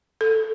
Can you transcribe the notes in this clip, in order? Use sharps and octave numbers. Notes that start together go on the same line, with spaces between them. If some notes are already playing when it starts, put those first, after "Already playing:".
A4